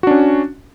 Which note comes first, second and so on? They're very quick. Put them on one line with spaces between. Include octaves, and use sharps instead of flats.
F#4 D4 C#4